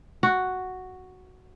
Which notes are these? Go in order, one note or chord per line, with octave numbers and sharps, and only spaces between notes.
F#4